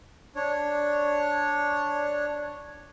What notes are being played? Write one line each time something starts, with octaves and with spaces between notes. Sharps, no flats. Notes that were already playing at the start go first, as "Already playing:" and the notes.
D4 C#5